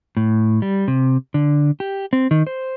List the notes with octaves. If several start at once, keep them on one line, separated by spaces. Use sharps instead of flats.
A2
G3
C3
D3
G4
C4
D#3
C5